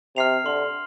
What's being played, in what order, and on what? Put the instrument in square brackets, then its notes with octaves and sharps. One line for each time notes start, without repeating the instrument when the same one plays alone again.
[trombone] C3 [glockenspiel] F6 C7 F7
[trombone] D3 [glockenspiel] C6